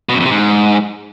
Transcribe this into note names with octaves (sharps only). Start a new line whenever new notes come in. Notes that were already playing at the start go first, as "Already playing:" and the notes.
B2
F#2
F2
C3
G#2